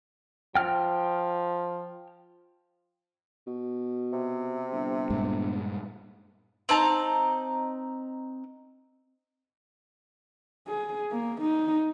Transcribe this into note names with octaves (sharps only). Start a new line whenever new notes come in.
F3 G5 F6
B2
C3
G1
G2 A#2 G#3
C4 D#4 A5 A#5
G#4
A#3
D#4